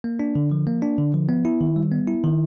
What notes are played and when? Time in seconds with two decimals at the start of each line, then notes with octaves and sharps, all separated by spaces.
0.04 A#3
0.19 D4
0.35 D3
0.52 F3
0.67 A#3
0.82 D4
0.98 D3
1.14 F3
1.29 B3
1.45 E4
1.61 D#3
1.76 G3
1.92 B3
2.07 E4
2.24 D#3